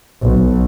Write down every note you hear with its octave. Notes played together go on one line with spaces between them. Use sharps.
B1